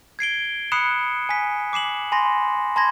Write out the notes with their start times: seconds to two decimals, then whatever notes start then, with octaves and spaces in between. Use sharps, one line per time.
0.19 G#6 C7 D7 G7
0.72 B5 D#6 F#6 C7 C#7 E7
1.29 G#5 B6
1.73 D6 C7 E7 F#7
2.12 G#5 B5 C6 A#6
2.76 A5 B5 C6 G#6 A#6